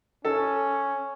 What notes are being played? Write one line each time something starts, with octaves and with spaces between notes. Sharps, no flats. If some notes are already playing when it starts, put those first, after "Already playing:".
C#4 A4